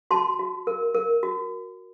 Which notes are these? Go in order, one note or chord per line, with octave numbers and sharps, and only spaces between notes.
F#4 A5 C6
F#4
A#4
A#4
F#4